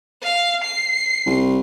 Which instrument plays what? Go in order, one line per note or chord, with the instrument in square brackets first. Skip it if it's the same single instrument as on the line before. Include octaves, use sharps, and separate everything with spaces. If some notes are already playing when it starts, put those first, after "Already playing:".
[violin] F5
C7
[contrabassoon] C2